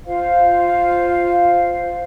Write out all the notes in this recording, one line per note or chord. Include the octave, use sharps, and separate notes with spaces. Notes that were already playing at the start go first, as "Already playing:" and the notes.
F4 C5 F5